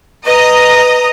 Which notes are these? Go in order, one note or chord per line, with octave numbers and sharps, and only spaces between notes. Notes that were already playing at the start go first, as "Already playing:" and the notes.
B4 D#5 A#5 D#6